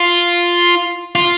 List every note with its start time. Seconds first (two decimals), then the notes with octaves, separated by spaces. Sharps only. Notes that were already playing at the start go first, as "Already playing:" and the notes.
Already playing: F4
1.15 F4